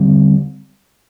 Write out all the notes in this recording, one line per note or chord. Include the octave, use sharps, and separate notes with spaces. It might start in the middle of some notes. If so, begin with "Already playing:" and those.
Already playing: D3 G3 C4